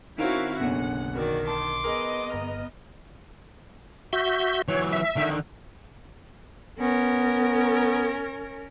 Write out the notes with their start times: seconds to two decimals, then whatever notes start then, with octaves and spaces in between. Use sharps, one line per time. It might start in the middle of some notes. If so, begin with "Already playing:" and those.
0.18 D#3 C4 C#4 E4 F#4 A#4 C5 F5
0.60 F#1 B1 B2 D3 A#3 C#4 F#5
1.16 D#3 F#4 D5
1.47 A5 C6 D6
1.84 B3 G#4 A#4 D#5
2.30 G1 A#5 F6
4.13 F#4 E5 G6
4.68 E3 F#3 C#5
4.93 E5
5.16 D3 D#3
6.80 B3 C#4 A#4